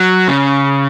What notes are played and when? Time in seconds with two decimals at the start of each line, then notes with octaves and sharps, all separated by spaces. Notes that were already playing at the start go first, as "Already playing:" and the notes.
Already playing: F#3
0.28 C#3